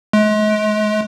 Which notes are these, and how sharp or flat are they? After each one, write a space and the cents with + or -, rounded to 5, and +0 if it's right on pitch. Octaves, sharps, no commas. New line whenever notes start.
G#3 +40